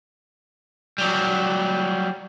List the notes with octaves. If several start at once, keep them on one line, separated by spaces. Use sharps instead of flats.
F#3 G3